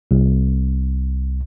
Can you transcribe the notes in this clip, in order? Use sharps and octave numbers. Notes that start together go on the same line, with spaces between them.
C2